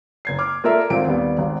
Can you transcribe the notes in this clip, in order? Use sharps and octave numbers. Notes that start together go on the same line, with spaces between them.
F#1 G#6 C7
D6 F6
A#3 F4 A4 A#4 D5 E5
G#1 A#2 C4 D7
D#2 G3 B3 D5
G#1